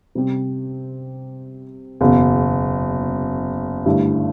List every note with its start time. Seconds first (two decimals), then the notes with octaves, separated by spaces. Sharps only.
0.15 C3 G3 C4 G4
2.01 F#1 E2 B2
3.86 G2 D3 A3 E4 G4